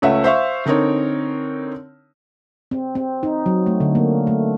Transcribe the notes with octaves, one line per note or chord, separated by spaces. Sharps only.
C#2 A3 C#4 E5 F#5
C5 E5 F5 C#6
D3 C4 D#4 A#4 C#5
C4
C4
D#4
F#3
A3
D3
A#3
A3